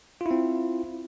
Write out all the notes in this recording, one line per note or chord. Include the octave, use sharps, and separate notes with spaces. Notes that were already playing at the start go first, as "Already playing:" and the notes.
C4 E4 F4